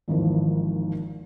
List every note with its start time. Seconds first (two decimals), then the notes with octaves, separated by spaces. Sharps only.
0.08 G#1 D#2 E3 F3